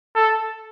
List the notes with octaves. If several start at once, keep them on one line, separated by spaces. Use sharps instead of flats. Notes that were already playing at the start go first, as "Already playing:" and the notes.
A4